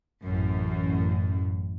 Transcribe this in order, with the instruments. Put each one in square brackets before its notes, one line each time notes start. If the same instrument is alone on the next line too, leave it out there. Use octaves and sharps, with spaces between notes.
[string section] A1 F#2